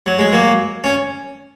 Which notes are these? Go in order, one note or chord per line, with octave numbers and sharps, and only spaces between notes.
F#3
G#3
F#3 A#3
C#4